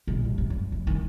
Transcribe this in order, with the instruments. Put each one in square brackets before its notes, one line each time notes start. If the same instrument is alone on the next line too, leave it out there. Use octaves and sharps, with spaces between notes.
[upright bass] A#1
G1
G#2
F#2
F2
D#3